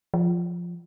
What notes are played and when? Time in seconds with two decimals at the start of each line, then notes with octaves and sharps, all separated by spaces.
0.14 F3